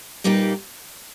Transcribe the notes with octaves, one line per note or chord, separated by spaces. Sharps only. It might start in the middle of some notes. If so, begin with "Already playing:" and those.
A#2 G3 A#3 D#4 G4